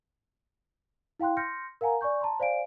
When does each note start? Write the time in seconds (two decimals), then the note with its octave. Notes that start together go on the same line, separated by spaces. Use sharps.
1.20 E4 F5 G5 C6 F#6
1.37 C6 F6 G6 A#6 C#7
1.81 A#4 F5 F#5 G#5 A#5
2.01 D5 G#5 C#6 G6
2.21 A5 A#5 C6
2.40 C5 D5 F5 G#5 D7